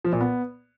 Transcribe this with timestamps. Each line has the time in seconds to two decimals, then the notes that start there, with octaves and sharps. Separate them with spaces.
0.05 F3
0.13 A#2
0.21 B3